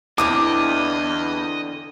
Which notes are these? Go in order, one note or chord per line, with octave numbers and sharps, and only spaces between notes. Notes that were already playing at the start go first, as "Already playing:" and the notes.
E2 D3 E3 C4 D#5 D6